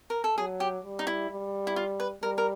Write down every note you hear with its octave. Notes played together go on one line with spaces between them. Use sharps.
A#4
A4
F#3 G#4
G4
G3
D#4
E4
G3
E4
F4
B4
G3 A#4
A#4